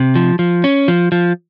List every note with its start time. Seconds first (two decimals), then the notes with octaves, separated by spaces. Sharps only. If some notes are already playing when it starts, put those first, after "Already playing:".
Already playing: C3
0.15 F3
0.39 F3
0.64 C#4
0.88 F3
1.12 F3